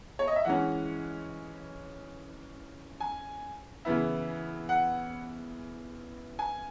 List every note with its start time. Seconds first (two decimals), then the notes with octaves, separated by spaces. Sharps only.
0.19 C#5
0.27 D#5
0.36 E5
0.45 E3 G#3 C#4 F#5
3.00 G#5
3.85 C#3 E3 B3 E4
4.69 F#5
6.39 G#5